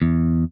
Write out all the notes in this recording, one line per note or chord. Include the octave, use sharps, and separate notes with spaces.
E2